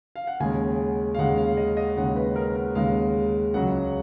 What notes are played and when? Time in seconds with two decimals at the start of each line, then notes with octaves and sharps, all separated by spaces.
0.16 F5
0.27 F#5
0.40 D#2 C#3 G#3 G#5
1.15 F5
1.18 D#2 C#3 G#3 F#5
1.38 F5
1.57 D#5
1.77 D#5
1.97 D#2 C#3 G#3 F#5
2.16 B4
2.36 A#4
2.56 A#4
2.75 D#2 C#3 G#3 F5
3.54 C#2 C#3 F#3 F#5